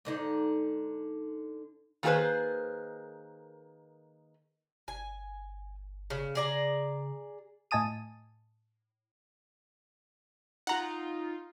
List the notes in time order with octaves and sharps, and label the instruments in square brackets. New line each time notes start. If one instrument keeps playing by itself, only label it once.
[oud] G#2 D3 D#4
[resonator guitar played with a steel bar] D#3 A#3 G4 G#4 B4 C5
[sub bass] G1 [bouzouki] G#5
[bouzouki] C#3
[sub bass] C#3 [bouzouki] G#4 D5 A#5
[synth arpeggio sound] A2 D#5 G#5 A5 D#6 D#7
[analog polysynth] D#4 F4 [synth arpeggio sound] F#5 A#5